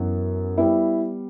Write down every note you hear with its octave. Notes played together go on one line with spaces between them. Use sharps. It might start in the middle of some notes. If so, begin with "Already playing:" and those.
Already playing: F#2 E3 B3
G3 B3 E4